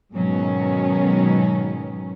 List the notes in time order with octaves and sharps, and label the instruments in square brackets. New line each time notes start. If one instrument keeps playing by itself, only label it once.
[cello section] G#2 B2 D#3 F#3 C#4